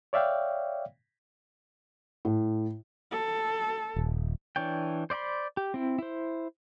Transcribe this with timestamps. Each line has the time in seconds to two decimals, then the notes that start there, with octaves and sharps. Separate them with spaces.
0.13 C#5 D5 E5 F5 G5
2.25 A2
3.12 A4
3.96 D#1
4.56 E3 D4 C#5 G5
5.10 C5 D5 E5 B5 C6
5.57 G4
5.74 C4 E4
5.99 E4 C5